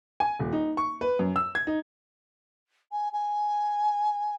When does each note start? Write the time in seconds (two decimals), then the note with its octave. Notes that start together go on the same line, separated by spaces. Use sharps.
0.20 G#5
0.39 D#1
0.53 D#4
0.77 C#6
1.01 B4
1.19 F#2
1.36 E6
1.55 G#6
1.67 D#4
2.92 G#5
3.13 G#5